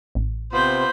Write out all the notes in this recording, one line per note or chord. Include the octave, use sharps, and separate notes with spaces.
A1
C3 B3 F4 C5 B5 G6